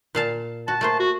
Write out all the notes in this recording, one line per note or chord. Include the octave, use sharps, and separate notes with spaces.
A#2 F5 A5
F#4 A5
A3 A#3 C5
F#4